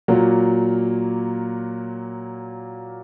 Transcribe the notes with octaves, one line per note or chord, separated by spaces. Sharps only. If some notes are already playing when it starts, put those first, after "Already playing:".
A#2 F#3 A#3